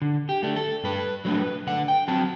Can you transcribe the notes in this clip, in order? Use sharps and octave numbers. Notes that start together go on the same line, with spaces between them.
D3
G4
A3 D4
A4
G2 B4
F#3 A3 D4 B4
D3 F#5
G5
F#3 C4 A5